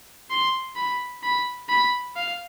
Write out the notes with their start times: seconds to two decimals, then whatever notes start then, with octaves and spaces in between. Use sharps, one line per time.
0.30 C6
0.76 B5
1.23 B5
1.69 B5
2.16 F5